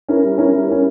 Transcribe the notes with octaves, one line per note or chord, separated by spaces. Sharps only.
C#4 E4 A#4
G3
C#4 E4 A#4
G3
C#4 E4 A#4